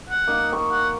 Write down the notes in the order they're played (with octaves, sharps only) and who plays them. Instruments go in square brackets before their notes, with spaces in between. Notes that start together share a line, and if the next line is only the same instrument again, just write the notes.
[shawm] F#5
[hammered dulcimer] A#3 D#4
C#6
[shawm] F#5